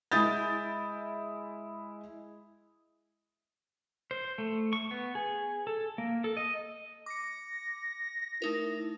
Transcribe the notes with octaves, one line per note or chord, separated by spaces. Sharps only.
G#3 E4 D#6 G6 A6
C5
A3
C#6
B3
G#4
A4
A#3
A4
D#5
D6 A#6 C#7
A3 D#4 E4 A#4